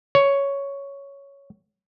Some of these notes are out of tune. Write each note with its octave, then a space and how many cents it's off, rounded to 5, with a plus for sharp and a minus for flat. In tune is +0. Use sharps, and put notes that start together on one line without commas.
C#5 +5